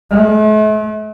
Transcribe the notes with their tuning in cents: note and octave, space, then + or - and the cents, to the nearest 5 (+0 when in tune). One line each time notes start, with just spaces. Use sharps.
A3 -45